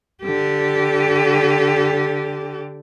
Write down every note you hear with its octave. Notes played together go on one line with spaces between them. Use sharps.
D3 G4